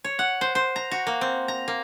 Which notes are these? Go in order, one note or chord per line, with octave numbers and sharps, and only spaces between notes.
C#5
F#5
C5
C5
A#5
F#4
A#3
C4
A#5
A#3